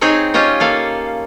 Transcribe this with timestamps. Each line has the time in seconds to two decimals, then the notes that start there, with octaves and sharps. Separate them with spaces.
0.01 C4 D#4 G#4 C#5 G5 G#5
0.34 C#4 F4 G4 C#5 D#5
0.60 A#3 A4 F5